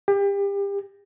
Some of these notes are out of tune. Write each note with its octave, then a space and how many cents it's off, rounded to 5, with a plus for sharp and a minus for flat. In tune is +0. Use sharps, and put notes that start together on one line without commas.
G4 +30